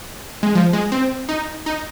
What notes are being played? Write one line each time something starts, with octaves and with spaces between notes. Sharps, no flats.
G#3
F3
G#3
C4
D#4
D#4